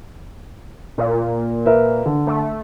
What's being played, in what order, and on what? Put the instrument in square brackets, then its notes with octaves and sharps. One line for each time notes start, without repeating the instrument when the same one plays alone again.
[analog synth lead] A#2
[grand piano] A#4 B4 E5
D3
[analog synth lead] A3